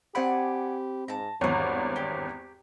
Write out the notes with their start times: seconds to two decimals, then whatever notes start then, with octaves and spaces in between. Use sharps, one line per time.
0.15 C4 G4 C5 D5 F#5 G#5 B5
1.08 G#2 A5 A#5
1.41 G#1 E2 G2 F4 F#4 C#5
1.96 G4